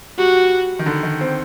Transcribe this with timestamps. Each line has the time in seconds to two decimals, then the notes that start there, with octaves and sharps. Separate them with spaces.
0.18 G3 F#4
0.79 D#3
0.86 D3
1.03 D#3
1.21 C4